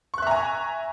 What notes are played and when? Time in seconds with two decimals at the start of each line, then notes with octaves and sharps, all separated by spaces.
0.14 C#6
0.18 F#6
0.22 E5
0.27 A#5
0.31 G#5